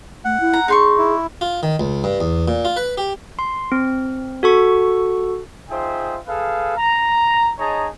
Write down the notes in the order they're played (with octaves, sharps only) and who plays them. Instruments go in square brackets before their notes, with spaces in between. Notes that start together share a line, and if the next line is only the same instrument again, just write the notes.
[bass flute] A3 [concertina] F#5
[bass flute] E4
[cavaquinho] A#5
[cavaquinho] D#4 C6 C#6 [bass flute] G#4
[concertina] E4
[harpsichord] F4
D#3
C#2
G2
E2
A#2
F4
B4
G4
[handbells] C6
C4
F#4 A4 C#6
[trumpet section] D#4 F4 G#4 C5 E5 G5
G#4 A4 B4 F5
A#5
D#4 G#4 C#5 D#5 A5 A#5